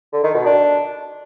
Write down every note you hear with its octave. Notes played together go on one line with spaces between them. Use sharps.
D3
D#3
B2
D4